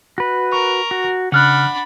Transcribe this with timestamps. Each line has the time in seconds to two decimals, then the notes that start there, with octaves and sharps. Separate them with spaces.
0.18 F#4 B4
0.52 A#4 C#6
0.91 F#4
1.32 C#3 D4 F#5 B5 F6 F#6